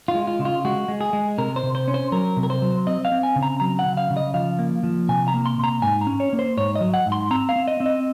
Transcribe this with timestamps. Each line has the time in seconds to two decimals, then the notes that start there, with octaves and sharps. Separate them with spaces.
0.08 F4
0.15 G#3
0.27 F4
0.39 C#3
0.45 F4
0.65 G#3 F#4
0.88 G#3
1.01 G#4
1.13 G#3
1.38 C3 A#4
1.56 C5
1.63 C3
1.75 C5
1.88 C#4
1.94 C5
2.12 F#3 A#4
2.37 C3
2.43 A#4
2.50 C5
2.62 F#3
2.87 C4 D#5
3.05 F5
3.12 C4
3.23 G#5
3.36 C#3
3.43 A#5
3.60 F#3 A#5
3.79 F#5
3.86 C#3
3.97 F5
4.10 C#3
4.17 D#5
4.34 F3 F5
4.59 A#3
4.83 F3
5.09 C3 G#5
5.28 A#5
5.34 A#3
5.46 C6
5.58 C3
5.64 A#5
5.82 G#2 G#5
6.01 A#5
6.07 C#4
6.20 C#5
6.33 A#3
6.39 C5
6.57 G#2 C#5
6.75 D#5
6.81 F#3
6.94 F#5
7.06 G#2
7.12 C6
7.31 C4 A#5
7.49 F5
7.56 C4
7.68 D#5
7.80 C4
7.86 D#5